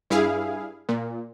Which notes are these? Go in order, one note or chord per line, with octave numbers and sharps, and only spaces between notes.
G2 E4 G#4 F5
A#2